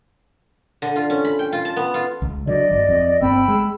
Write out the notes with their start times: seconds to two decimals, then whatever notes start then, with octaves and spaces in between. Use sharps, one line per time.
0.82 D3
0.96 F4
1.10 C#4
1.25 B5
1.39 G5
1.53 F4
1.65 A5
1.76 B3
1.94 F4
2.22 C#2
2.47 D3 F#3 D5 D#5
2.71 G1
2.89 F2
3.21 G1 C4 G5 B5 E6
3.48 G#3